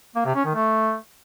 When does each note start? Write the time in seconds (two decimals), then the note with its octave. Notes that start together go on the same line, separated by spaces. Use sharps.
0.16 A#3
0.26 C3
0.35 C#4
0.45 D#3
0.55 A3